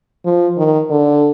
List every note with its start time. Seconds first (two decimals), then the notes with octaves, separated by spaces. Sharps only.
0.25 F3
0.58 D#3
0.90 D3